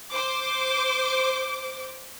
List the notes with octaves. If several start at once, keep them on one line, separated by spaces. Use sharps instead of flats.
C5 D6